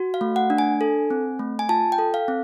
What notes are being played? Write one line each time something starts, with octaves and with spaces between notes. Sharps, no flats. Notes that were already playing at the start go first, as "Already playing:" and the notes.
Already playing: F#4
F5
A3
F#5
D4
G#5
A4
C4
A3
G#5
F4 A5
G5
A4
F5
C4